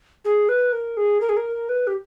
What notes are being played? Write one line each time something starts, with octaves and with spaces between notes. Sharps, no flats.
G#4
B4
A#4
G#4
A#4
G#4
A#4
B4
G4